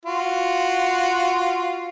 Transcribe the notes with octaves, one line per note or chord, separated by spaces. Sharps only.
F4 F#4